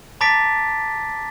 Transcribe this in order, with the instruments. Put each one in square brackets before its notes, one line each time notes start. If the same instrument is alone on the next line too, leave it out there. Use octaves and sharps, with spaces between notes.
[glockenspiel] A5 A#5 D6 A6 B6 D7